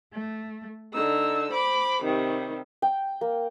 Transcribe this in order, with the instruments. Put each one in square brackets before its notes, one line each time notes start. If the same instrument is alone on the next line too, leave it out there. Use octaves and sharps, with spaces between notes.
[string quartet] A3
D3 D#4 E6
C5 B5 D6
C3 D#3 G3
[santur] G5
A#3